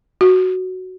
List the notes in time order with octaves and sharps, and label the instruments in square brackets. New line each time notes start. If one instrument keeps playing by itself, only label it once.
[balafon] F#4